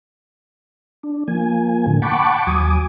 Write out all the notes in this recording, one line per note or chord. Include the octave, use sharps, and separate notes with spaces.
D4
F3 A#3 G#5
A2 D3
F#5 G5 A5 B5 C#6 D6
D#2 F#3 G#5 D6 D#6